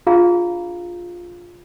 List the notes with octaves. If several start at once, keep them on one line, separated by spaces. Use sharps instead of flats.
D4 F4 G#4 D5 F5 A#5